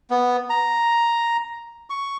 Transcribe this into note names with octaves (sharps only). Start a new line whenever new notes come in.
B3
A#5
C#6